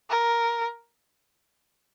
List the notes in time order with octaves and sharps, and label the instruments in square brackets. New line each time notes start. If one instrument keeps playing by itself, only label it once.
[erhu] A#4